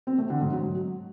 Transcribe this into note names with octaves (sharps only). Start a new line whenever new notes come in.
C4
A3
D3
G#2
F#3